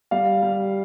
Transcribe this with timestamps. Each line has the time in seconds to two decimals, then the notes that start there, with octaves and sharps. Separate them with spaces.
0.11 G3 F5
0.43 G3